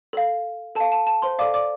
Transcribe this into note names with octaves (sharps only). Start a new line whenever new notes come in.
A4 F5
A4 F5 A5
A5
A5
C5 C6
A4 D5 F5 D6
D5 D6